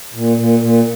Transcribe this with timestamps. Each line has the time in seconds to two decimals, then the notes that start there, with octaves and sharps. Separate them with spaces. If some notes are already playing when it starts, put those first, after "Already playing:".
0.14 A#2
0.37 A#2
0.60 A#2